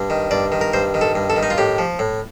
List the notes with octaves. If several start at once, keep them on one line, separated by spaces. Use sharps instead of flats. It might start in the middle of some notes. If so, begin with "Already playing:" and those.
Already playing: G2
D#3
G2 D5
D#3
A#4
G2 C5
D#3
A4
G2
A4
D#3
D#4
F4
A2 G4
F3
A2